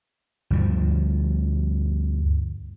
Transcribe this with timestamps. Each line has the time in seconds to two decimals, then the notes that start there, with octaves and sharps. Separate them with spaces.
0.50 D2 G2 F3